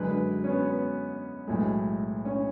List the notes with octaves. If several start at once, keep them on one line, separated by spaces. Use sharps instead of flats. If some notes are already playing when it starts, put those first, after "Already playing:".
Already playing: F#2 D3 G#3 B4
B4
C#4
B3
B3
B1 A2 G#3
C#4